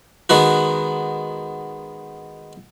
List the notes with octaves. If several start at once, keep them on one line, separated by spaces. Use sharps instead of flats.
D#3 G#3 B3 F#4